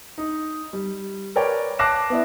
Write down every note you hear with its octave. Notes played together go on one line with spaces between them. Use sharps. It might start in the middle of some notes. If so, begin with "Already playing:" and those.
D#4
G3
A#4 B4 C#5 D5 G5
A5 D6 F#6 A#6 C7 E7
B3 E4 D5